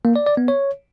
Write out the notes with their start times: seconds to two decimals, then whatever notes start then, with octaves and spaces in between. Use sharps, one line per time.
0.05 A#3
0.16 D5
0.26 D5
0.37 B3
0.48 C#5